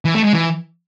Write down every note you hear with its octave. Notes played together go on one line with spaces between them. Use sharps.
E3
A3
G#3
E3